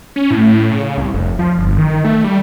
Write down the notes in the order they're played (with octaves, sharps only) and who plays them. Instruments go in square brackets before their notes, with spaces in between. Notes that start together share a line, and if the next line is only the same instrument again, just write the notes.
[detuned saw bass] C#4
A2
C#3
C2
F1
F3
G1
D#3
A3
G3